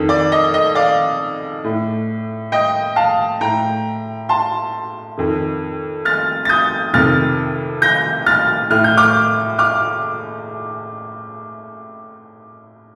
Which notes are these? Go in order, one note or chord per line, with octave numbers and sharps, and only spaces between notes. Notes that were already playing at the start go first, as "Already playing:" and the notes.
Already playing: F2 D#3
D5
D#5
D#5
D5 F5
A2
D#5 G5
F5 A5
A2 G5 A#5
A5 C6
F2 D#3
F6 A6
A6
D#6 G6
F2 C3 D#3 F6 A6
G6 A#6
F6 A6
A2 F6
G6
D6 F6
D6 F6